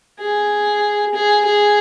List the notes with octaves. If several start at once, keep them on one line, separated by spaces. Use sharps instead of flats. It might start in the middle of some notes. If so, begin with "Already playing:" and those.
G#4
G#4
G#4